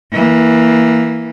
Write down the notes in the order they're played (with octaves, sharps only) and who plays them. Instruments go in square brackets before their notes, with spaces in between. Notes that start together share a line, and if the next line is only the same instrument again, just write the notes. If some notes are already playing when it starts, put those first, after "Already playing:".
[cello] E3 A#3